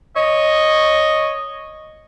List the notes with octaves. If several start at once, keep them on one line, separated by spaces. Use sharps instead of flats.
C#5 D#5